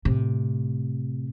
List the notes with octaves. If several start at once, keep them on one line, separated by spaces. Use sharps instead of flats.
A2 C3